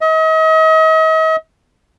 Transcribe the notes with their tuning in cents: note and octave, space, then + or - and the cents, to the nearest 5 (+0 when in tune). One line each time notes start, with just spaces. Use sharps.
D#5 +40